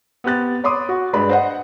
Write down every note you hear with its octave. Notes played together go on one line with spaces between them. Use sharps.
B3 C4 G4 F#6 A6
C#5 B5 C6 D6 D#6
F#4
G2 G#3 B4 D5 B5
C5 D#5 F#5